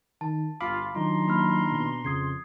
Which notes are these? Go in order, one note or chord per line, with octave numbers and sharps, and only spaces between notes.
D#3 A5
G1 F4 F5 B5 D6
D#3 F#3 D4 D#4 F4 A#5 C6
A#3 B5 F6
B2
F2 C#3 D#6 G#6 C7